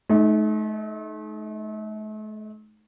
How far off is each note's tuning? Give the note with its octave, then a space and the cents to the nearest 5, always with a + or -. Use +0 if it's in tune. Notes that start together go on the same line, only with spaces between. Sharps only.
A3 -40 D#4 +0